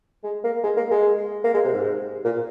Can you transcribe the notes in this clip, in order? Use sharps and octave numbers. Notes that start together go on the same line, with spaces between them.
G#3
A#3
G#3
A#3
G#3
A#3
G#3
C3
G#2
A#2